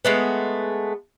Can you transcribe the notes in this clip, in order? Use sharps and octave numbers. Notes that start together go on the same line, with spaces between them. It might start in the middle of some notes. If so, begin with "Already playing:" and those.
G#3 A3 B3